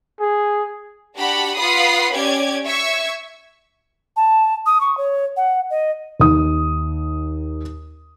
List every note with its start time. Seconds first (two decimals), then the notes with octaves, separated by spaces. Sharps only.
0.20 G#4
1.18 D4 F#4 G4 F#5 A5 B5
1.56 F4 B4 F#5 B5 D#6 C7
2.13 C#4 G4 D5 D6 G#6
2.66 E5 C#6 E6 G#6
4.16 A5
4.66 D#6
4.81 C#6
4.97 C#5
5.37 F#5
5.70 D#5
6.20 D#2 D#3 D#6